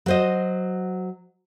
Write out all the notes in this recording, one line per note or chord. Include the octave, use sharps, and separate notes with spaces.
F#3 C5 D#5